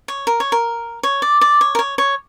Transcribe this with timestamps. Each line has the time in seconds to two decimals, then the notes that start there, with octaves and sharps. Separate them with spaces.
0.08 C#5
0.27 A#4
0.40 C#5
0.52 A#4
1.03 C#5
1.22 D5
1.41 D5
1.61 C#5
1.75 A#4
1.79 C#5
1.98 C#5